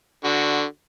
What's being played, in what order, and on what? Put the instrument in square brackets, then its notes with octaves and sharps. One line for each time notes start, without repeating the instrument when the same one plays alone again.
[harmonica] D3 F#4